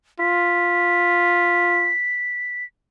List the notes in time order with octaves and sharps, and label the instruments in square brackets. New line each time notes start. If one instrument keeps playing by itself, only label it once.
[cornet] F4 [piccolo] B6